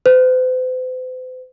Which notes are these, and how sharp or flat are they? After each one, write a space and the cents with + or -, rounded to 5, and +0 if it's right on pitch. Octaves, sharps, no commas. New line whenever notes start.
C5 -45